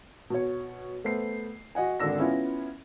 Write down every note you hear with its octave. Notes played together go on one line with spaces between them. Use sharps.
B2 C#5
A3 B3 C5 C7
F#4 D#5 F#5 G#5
G#1 D3 C4 D4 E6 A#6
B3 C#4 E4 F4